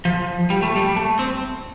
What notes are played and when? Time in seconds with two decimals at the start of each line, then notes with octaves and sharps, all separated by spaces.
0.05 F3
0.50 G3
0.62 A3
0.76 G3
0.96 A3
1.19 C4